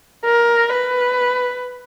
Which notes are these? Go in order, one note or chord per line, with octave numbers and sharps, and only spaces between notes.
A#4
B4